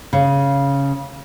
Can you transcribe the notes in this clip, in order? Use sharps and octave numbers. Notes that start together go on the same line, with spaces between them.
C#3